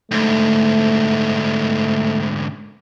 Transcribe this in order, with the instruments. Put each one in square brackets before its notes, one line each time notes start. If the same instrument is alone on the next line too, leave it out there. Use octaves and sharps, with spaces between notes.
[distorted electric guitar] D2 G#2 [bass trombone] A3